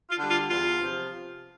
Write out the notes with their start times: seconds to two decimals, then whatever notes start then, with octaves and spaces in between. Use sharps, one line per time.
0.10 F4
0.19 D3 G3
0.30 F4
0.50 E2 F4
0.80 C3 F3